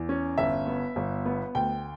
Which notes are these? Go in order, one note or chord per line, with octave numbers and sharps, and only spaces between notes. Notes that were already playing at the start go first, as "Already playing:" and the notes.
Already playing: E2
C#4
G1 E5
B3
G1
B3
D2 G5